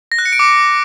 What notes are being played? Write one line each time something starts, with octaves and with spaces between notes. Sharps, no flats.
A#6
F#6
C#7
D7
D6